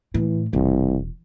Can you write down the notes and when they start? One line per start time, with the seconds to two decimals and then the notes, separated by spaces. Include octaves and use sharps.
0.14 A2 E3
0.53 E1 C2